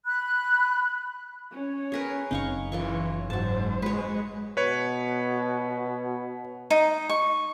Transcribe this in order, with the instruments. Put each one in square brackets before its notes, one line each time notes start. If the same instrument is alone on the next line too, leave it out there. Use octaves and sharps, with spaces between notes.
[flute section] B5 F#6
[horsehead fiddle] C#4 C#5
[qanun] G#4 A#4 B4
[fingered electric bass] F#1 C#3 C4 [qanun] D#4 F5 C#6
[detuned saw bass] E3 [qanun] F4 A#4 C#6 [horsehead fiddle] C#5
[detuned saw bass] G#2 [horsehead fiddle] F#3 C5 [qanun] F#4 A5
[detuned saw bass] G#3 [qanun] B4 C#5
[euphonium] B2 [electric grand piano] B4 C#5
[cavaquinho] D#4
C#6